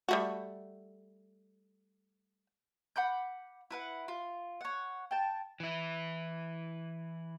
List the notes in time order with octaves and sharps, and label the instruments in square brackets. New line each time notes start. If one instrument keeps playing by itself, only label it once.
[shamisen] G3 A3 F#4
[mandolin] F#5 B5 D6 G6
E4 B4 F#5
F4
C#5 F#5
G5 A5
[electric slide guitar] E3 E4